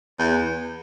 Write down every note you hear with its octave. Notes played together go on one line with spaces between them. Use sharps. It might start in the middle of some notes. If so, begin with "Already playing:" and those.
E2